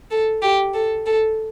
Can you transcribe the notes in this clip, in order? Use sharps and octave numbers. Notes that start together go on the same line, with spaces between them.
A4
G4
A4
A4